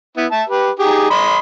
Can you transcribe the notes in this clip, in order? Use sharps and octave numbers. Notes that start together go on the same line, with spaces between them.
B3 E4
E5 A5
G4 B4
D#4 G4 G#4
D#5 B5 C6